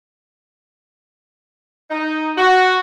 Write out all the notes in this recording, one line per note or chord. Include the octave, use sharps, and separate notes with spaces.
D#4
F#4